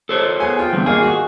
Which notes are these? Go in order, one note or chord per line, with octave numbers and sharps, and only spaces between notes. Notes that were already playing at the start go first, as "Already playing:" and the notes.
A4 C5 C#5
B3 G#4 G#5
F4 G5
E2 G2
G#1 A#3 G#4 F5
F#4